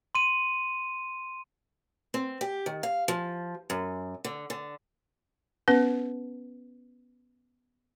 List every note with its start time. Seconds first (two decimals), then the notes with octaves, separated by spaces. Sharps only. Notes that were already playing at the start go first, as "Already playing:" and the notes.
0.15 C6 D#7
2.14 C4
2.41 G4
2.66 D#3
2.83 F5
3.08 F3
3.70 F#2
4.25 D3
4.50 D3
5.68 B3 C#4 B4